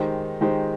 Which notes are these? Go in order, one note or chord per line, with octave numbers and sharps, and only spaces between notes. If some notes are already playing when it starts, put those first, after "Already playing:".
Already playing: D#3 G#3 D#4 G4 C5
D#3 G#3 D#4 G4 C5